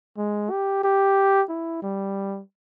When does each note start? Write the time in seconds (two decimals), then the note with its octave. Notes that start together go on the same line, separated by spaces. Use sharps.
0.18 G#3
0.50 G4
0.84 G4
1.49 E4
1.82 G3